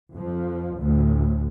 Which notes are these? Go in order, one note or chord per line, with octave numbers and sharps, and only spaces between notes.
F2 F3
D2 A2